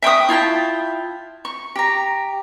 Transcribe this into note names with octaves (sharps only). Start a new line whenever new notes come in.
E5 G5 C#6 D#6
E4 F4 G5 A5
C#6
G4 A#5